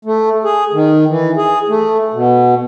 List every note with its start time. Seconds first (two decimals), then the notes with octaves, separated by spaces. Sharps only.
0.05 A3
0.44 G#4
0.73 D#3
1.08 E3
1.37 G#4
1.69 A3
2.13 B2